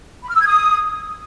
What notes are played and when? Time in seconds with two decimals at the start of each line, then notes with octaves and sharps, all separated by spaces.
0.23 B5
0.29 F6
0.35 E6
0.40 G#6
0.46 D#6